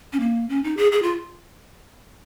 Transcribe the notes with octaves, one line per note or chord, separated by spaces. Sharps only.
C#4
A#3
C#4
D#4
G#4
G#4
F4